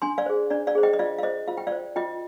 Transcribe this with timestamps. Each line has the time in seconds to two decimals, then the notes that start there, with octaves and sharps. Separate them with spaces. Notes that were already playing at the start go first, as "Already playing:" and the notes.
0.02 D4 G#5 C6
0.18 D5 F5
0.26 G#4 C5
0.50 D4 D5
0.67 D5 F5
0.75 G#4 C5
0.83 D#5 G5
0.93 D#5
0.99 F4 D5 F5
1.19 F5
1.23 C5 D#5
1.48 F4 F5
1.57 G5
1.67 D5 F5
1.72 C5
1.96 F4 D#5 G5